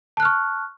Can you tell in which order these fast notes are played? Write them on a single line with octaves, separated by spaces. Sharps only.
A5 F#6 F6 C#6